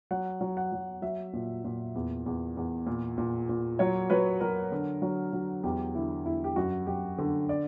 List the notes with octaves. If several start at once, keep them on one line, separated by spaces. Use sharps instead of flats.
F#3 F#5
F#3
F#5
F#3
F#3 E5
A#2
A#2
E2
E2
E2
A#2
A#2
A#2
F#3 C#5
F#3 B4
F#3 A#4
D3
F#3
F#3
E2 G4
D3 E4
E2 E4
G4
F#2 F#4
F#2 G4
D3
D5